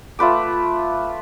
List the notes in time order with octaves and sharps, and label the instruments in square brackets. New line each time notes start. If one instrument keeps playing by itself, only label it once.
[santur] A3 F4 B4 D6